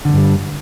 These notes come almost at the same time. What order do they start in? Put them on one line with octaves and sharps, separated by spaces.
D3 E2 G2 G3